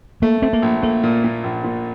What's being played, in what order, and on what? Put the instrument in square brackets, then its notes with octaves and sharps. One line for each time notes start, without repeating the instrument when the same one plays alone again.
[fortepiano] A3 [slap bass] A#3
[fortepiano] A3 [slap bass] C4
[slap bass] A#3
[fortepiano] A#1
[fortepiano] A3 [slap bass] A#3
[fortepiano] A#2
A#2
A#1
A#2